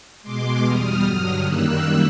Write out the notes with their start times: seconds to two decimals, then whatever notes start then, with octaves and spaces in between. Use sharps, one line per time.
0.23 B2 G#3 C6 D6
0.63 E2 B2 G3 D#6 F6
1.03 G2 D3 F#3 D#6 F6
1.43 F#2 D#3 G3 A#3 E6 F#6